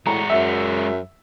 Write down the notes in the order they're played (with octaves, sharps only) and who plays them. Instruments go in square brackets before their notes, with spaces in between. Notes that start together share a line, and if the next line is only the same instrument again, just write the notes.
[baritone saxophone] A2 [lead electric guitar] G#3 F#4 [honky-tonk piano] A#5
[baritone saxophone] F#2 [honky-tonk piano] E5